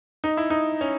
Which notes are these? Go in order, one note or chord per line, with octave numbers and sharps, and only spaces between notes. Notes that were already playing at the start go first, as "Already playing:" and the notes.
D#4
E4
D#4
C#4